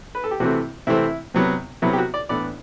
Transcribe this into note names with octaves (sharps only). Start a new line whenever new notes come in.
B4
A4
G4
C3 E3 A3 C4 F#4
C3 E3 A3 C4 E4
C3 F#3 B3
C3 F#3 B3 E4
G4
F#4
D5
A2 E3 B3 D4 D5